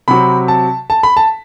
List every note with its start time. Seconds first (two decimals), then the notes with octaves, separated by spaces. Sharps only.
0.08 C3 F#3 C4 B5
0.48 A5
0.90 A5
1.03 B5
1.17 A5